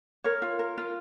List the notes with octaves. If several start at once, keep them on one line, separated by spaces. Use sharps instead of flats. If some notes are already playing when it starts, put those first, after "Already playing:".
A#4 C#5
F4
A#4
F4